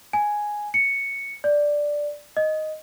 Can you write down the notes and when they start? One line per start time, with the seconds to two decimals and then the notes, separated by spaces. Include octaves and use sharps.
0.13 G#5
0.74 C#7
1.44 D5
2.37 D#5